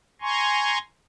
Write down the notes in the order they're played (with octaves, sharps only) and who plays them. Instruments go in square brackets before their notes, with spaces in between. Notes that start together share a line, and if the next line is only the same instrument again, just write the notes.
[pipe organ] G#5 A#5 C6 C#6